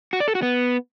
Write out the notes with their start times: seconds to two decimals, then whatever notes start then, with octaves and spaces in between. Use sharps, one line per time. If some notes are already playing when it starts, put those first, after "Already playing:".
0.13 F#4
0.20 D5
0.28 A4
0.35 F#4
0.42 B3